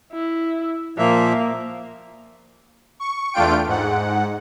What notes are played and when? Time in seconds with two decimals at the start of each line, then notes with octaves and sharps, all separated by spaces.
0.13 E4
0.98 A#2 F3 A#3 E5
3.00 C#6
3.33 E2 A3 D4 F4 G5 D7
3.67 G#2 F#5